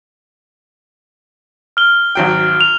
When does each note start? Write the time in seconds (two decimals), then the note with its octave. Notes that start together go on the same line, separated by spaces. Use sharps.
1.77 F6 G7
2.15 G#1 F#3 G5
2.61 F7